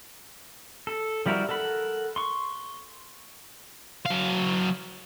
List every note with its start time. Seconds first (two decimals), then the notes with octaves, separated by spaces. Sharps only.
0.87 A4
1.26 F3 G3 E4 F#4 A#4
1.49 A4 A#4 F#5 B5
2.16 C6 C#6
4.06 F#3 F5